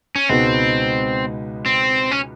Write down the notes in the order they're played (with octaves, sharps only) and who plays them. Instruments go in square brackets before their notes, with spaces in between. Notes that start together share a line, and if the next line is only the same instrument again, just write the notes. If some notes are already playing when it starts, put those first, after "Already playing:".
[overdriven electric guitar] C#4
[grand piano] C#2 B2 G#3 B3 D#4 [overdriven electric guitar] C4
[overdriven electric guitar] C4
C#4